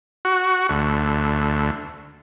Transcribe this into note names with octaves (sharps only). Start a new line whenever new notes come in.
F#4
D2